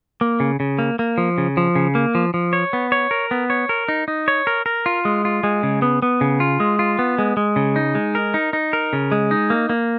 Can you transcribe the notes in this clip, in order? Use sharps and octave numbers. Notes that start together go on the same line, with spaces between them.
A#3
C#3
C#3
A#3
A#3
F3
C#3
F3
C#3
A#3
F3
F3
C#5
B3
C#5
A#4
B3
C#5
A#4
D#4
D#4
C#5
A#4
A#4
F4
G#3
F4
G#3
C#3
B3
B3
C#3
F4
G#3
F4
B3
G#3
G#3
C#3
D#4
G#3
A#4
D#4
D#4
A#4
C#3
G#3
D#4
A#3
A#3